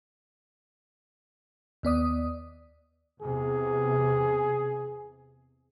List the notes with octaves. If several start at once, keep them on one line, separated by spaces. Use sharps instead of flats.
D#2 B3 D5 D#6
E2 C3 G#4